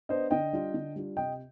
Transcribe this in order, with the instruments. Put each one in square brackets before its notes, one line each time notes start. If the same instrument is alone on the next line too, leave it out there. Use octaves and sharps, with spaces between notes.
[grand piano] B3 D4 C5 D#5
D3 D#5 G5
G3 D4 F4
D3
G3 D4 F4
C3 D#5 G5